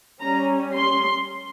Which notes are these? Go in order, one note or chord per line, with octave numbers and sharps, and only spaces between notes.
G3 C#4 A#5
C6